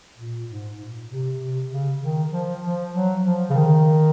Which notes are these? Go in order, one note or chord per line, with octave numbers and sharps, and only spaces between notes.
A#2
G#2
A#2
C3
C3
C#3
D#3
F3
F3
F#3
F3
C#3
D#3